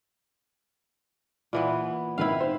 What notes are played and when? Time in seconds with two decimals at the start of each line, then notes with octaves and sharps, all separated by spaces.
1.53 A#2 E3 B3
2.18 G#1 D#3 E4 B4 F5
2.40 C5